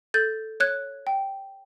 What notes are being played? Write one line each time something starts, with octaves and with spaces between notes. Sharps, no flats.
A4 G6 A6
C#5 F#6 G#6
G5